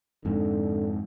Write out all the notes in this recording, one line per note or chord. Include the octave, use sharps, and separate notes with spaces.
F2 G#2 D3